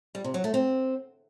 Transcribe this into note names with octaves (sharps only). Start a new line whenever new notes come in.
G3
C3
F#3
A3
C4